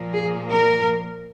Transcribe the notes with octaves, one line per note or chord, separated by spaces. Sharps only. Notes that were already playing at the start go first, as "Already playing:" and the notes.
Already playing: A#2 F3 A#3
G#4
A#4